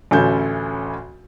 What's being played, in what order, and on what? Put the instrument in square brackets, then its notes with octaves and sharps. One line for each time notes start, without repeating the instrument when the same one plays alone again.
[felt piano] A1 D2 C#4 A4 G#5 G6